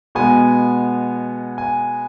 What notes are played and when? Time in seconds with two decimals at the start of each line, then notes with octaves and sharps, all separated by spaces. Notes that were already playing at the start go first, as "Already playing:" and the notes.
0.15 B2 G#3 B3 G#5
1.58 G#5